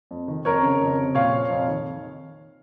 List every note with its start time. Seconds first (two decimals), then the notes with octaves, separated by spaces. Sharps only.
0.11 F2
0.28 D#3
0.45 F2 A#4 C#5
0.62 C#3
0.81 F2
0.98 C3
1.15 A#2 C#5 F5
1.32 F3
1.50 F2
1.68 D#3